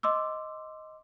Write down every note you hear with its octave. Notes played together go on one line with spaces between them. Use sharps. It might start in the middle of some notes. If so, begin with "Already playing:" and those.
D#5 C6 D6 E6